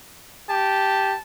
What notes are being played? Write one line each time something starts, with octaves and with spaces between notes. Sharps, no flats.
G4 A5